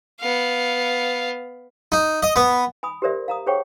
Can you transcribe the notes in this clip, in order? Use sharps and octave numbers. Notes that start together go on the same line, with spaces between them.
B3 F5
D#4
D#5
B3
G#5 B5 D#6
G4 A4 A#4 C5 D5 E5
F5 A#5 D#6
G#4 C5 C#5 F#5 G5 C#6